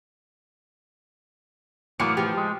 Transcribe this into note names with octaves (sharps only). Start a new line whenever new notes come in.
A2 E3 F#3 A#3 B3 D6 F6 C#7
F3 G4
G#3